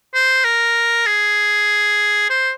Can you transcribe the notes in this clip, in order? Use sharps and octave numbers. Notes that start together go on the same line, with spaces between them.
C5
A#4
G#4
C5